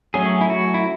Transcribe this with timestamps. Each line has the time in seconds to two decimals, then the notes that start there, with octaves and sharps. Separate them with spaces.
0.14 F#3 A3 C#4 G#4
0.41 E4
0.50 F#4
0.74 E4